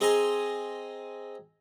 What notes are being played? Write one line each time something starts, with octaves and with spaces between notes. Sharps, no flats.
C4 G#4 D#5 G#5 A#5 C6